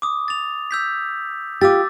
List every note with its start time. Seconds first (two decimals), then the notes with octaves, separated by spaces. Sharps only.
0.02 D6 D#6
0.28 A6 F7
0.71 E6 G6 B6
1.61 F4 G4 D6 E6 A6